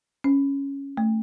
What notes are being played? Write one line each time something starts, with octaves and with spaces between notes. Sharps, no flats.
C#4
A3